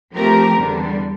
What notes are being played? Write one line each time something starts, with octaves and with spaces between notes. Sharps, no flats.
F3 A3 C4 G4 A#4
E2 D3 G3